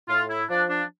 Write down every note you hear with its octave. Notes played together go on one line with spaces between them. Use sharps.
A2 F4
E4
F3 D4
D4